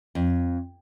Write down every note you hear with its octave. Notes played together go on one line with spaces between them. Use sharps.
F2